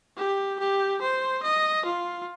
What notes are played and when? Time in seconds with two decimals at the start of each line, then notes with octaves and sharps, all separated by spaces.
0.17 G4
0.59 G4
1.01 C5
1.43 D#5
1.85 F4